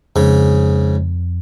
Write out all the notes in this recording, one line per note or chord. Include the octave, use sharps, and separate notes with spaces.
F2 G#2 C#3